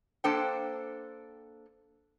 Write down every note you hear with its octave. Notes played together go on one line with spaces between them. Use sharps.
A#3 D4 A4 C5 G5